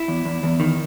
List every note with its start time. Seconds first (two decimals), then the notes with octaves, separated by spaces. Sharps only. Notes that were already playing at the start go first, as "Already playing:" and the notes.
Already playing: E4
0.08 E2
0.25 E2
0.43 E2
0.60 D#3